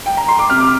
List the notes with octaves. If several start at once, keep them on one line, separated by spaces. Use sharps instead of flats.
G5
A#5
C6
D6
C3 F6
D6